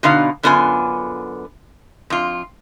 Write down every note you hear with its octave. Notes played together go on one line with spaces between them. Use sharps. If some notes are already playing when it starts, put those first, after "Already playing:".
B2 D3 B3 D#4 F5
F#2 D3 B3 F4 G4 G#5
F2 F4